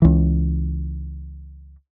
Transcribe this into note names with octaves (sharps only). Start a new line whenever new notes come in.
C#2 E3